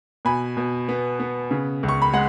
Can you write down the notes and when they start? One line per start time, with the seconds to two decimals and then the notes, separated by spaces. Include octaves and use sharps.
0.25 B2 G#5 B5
0.57 B2
0.89 B3
1.20 B3
1.51 C#3
1.83 C#2
1.88 C#6
2.02 B5
2.13 G#3 F#5